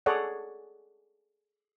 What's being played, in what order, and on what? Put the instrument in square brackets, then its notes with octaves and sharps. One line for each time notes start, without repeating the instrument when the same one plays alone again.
[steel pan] G#4 A4 C#5 D5 F#5